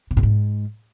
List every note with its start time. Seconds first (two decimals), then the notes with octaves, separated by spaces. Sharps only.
0.11 C3
0.17 A#2
0.23 G#2